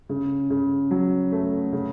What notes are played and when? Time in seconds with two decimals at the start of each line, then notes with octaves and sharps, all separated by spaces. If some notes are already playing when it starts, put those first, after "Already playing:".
0.09 C#3
0.50 C#3
0.91 F#3
1.32 A3
1.73 C#3